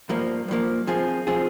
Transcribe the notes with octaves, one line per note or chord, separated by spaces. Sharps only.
G2 F3 A#3
G2 F3 A#3
F3 C4 F4 G#4
F3 C4 F4 G#4